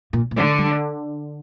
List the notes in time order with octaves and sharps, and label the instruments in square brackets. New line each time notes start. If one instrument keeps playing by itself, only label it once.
[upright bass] A#2
A#2
[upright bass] A2 [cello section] D3
[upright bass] G3